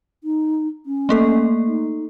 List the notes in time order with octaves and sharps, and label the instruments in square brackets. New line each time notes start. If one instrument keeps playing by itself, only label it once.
[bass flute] D#4
C#4
[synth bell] A3 A#3 A4
[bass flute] D#4